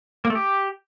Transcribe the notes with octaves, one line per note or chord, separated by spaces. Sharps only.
A#3
A3
G4